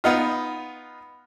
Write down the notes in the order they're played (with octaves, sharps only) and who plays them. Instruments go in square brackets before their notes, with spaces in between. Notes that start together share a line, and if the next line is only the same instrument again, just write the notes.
[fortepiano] B3 D#4 F4